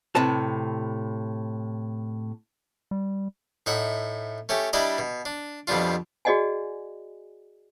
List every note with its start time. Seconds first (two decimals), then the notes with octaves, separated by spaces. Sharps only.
0.15 A2 C3 B4 A5
2.91 G3
3.66 A2 D#4 E5 F#5
4.49 A3 C#4 G4
4.73 G3 D4 E4 D5 D#5 A#5
4.98 B2
5.25 D4
5.67 F2 B2 G3 D4 F4
6.25 F#4 G#4 D5 D#5 F#5 G#5